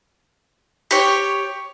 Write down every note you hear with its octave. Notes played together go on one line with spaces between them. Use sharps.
G4 C#5